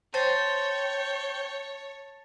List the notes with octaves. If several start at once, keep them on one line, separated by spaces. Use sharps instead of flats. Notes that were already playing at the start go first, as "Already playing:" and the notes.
C5 C#5 G5 A5 G6 A6 A#6